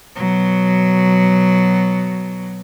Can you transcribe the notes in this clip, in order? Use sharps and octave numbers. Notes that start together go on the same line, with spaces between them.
B2 F#3